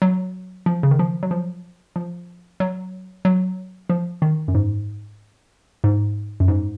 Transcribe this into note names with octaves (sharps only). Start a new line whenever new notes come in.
F#3
F3
C#3
D#3
F3
F#3
F3
F3
F#3
F#3
F3
D#3
F#2
G#2
G#2
F#2
G#2